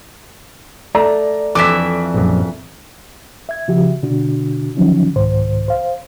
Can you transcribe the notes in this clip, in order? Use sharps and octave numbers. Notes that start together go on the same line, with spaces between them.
A3 D5 A#5
F2 E3 E5 D6 B6
A#1 F#2
E5 G#6
C#3 F3 F#4 G4 E5
B2 D3 D4 F#4
D3 D#3 F3 F#3 C#4 D#4
C2 G#2 D#3 C5
C5 F5